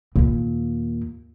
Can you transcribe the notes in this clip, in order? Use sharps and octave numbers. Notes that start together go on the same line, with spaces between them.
D#2 A#2